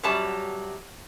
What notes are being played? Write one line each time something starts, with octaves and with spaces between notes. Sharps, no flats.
F#2 F#3 G3 A5